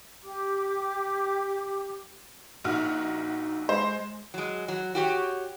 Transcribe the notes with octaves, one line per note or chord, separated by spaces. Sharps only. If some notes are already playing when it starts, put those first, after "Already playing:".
G4 D6
A#1 D#4 F#4 F6
G#3 C5
F#3 G#3
F#3
F#4 G4 C#5